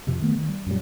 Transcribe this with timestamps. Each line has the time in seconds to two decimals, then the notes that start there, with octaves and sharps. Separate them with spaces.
0.07 F2 C3 F3
0.22 D#3 A3 B3
0.35 D#3
0.48 G3
0.66 F#2 A#2 F#3 G3